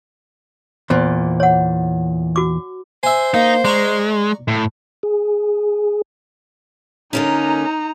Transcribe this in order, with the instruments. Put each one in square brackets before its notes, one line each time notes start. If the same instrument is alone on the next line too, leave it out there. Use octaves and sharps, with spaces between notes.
[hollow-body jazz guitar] E2 A#2 [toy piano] C5
[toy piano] C#5 F#5
F#4 D6
[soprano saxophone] C5 [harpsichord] E5 G#5
[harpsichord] A#3 [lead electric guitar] D#4
[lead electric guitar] G#3 [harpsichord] D5 A#5 C#6
[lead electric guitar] A2
[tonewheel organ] G#4
[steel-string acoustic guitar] D3 A#3 C#4 [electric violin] D#4 A#5